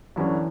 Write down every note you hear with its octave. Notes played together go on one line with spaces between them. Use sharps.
F#2 D3 E3 G3 C#4